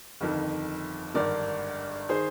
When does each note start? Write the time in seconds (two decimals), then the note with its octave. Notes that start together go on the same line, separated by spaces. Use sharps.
0.21 G1 F2 D#3
1.14 G#1 G2 D3 A#4 D5
2.09 D#3 G#4 C5